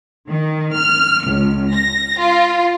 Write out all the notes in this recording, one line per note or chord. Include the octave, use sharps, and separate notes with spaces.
D#3
F6
C#2
A#6
F4